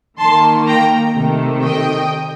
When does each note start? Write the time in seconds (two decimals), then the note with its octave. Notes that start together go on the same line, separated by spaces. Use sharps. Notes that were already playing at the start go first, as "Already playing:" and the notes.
0.19 D#3 A#3 A5 C6
0.67 G5 A#5
1.15 C3 D#3 A3
1.63 D#5 G5